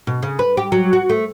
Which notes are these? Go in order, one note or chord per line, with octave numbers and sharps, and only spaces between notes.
B2
C#3
B4
G4
F#3
F#4
A3